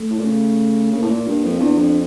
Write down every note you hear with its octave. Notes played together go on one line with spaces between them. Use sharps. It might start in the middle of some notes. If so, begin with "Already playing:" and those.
Already playing: A3
A2
A#2
C#3
C#3 A#3
A2
A#2
G2 A#3
F2
E2 D4
F2